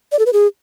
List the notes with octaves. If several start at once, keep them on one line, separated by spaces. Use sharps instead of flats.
D5
A4
B4
G#4